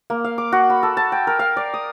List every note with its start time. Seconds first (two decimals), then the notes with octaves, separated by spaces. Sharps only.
0.10 A#3
0.24 F5
0.38 D6
0.52 F#4
0.70 B5
0.83 A4
0.97 A5
1.12 G5
1.27 A#4
1.39 F5
1.57 D5
1.74 D#6